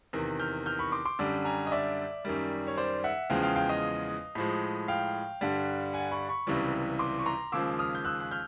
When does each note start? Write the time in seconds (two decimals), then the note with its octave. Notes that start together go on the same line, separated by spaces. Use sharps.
0.13 E2 C3 D#3
0.40 F6 G6
0.66 F6 G6
0.79 B5 C#6
0.92 C6 D6
1.05 C6 D6
1.19 F#2 D3 G3
1.45 G#5 A#5
1.67 D#5
1.72 D5 E5
2.25 F#2 D#3 G3
2.67 C#5
2.77 C5 D5
3.04 E5 F#5
3.30 E2 C#3 F3 G#3 F5 G5
3.43 F5 G5
3.56 F5 G5
3.69 D#5 F5
4.35 A2 F3 G#3
4.88 F5 G5
5.41 G2 D3 G3
5.94 F#5 G#5
6.12 B5 C#6
6.29 B5 C#6
6.47 C#2 C3 E3 G3
6.99 C6 D6
7.19 C#6
7.26 A#5 C6
7.52 D#2 C#3 F3 G#3 D6 E6
7.79 D#6 F6
7.95 G6
8.05 E6 F#6
8.20 F#6
8.31 F6 G6